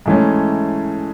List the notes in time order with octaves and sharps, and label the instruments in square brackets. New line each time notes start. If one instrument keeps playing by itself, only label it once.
[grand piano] G#2 E3 A3 C#4